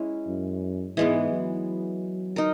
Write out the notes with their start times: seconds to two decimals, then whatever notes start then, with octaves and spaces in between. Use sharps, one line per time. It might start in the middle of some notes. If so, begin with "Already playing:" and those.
Already playing: G#3 C#4 E4
0.27 F#2
0.96 G#2 E3 G#3 B3
1.31 F#3
2.36 D#4 A#4